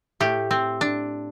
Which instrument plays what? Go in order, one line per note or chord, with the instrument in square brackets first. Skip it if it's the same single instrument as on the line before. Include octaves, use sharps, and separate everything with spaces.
[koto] A2 A3 G4
C4
D4